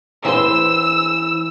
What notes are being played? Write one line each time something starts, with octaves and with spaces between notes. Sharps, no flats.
E3 C5 E6